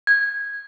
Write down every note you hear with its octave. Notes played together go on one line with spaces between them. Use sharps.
G#6